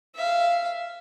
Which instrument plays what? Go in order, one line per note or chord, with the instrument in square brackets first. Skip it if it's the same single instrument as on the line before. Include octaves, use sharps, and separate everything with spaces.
[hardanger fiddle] E5 F5